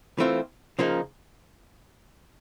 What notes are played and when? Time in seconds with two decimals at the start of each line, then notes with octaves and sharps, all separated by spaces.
0.18 E3 A3 C4 F4
0.79 C#3 F3 A#3 D#4